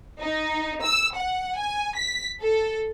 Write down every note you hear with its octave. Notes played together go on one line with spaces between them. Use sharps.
D#4
E6
F#5
G#5
B6
A4